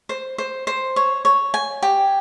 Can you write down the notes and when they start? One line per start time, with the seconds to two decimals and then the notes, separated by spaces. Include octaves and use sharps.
0.09 C5
0.38 C5
0.67 C5
0.96 C#5
1.25 C#5
1.54 G#5
1.82 G4